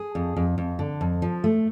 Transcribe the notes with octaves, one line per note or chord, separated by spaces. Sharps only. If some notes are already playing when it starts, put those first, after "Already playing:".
Already playing: G#4
F2
F2
F2
D3
F2
F3
A3